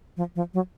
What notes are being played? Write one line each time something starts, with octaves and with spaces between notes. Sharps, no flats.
F3
F3
F#3